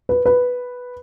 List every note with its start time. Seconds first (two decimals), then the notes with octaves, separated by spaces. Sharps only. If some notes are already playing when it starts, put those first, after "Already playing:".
0.09 B4
0.26 B4